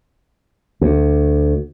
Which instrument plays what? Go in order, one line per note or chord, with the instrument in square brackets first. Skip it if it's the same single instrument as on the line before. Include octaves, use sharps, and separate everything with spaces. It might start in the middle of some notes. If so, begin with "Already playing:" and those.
[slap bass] D2